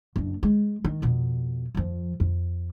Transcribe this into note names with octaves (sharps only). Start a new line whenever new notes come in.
F#1 D4
G#3
D#3
F2 B2
F2 F3
F2